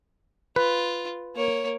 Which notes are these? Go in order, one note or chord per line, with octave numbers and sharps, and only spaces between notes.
F4 B4
A#3 C#5